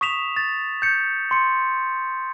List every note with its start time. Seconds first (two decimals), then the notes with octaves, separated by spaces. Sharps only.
0.01 C#6 D#6 B6 E7 F7
0.37 A6
0.82 G6 C#7
1.31 C6 C#7